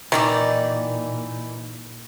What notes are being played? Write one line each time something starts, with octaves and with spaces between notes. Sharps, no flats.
A#2 D#3 E3 D#4 D5